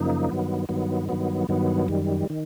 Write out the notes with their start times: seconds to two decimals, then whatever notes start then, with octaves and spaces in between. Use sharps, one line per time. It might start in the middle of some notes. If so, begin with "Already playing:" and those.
Already playing: F#2 C#3 F3 A#3 D#4
0.29 G2 D#3 F#3 B3
0.69 G2 D#3 F#3 B3
1.09 G2 D#3 F#3 B3
1.49 G2 D#3 F#3 B3
1.88 F#2 D#3 G3
2.30 D#3